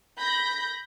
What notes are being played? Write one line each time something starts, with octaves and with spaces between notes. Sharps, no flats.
B5 G6 A#6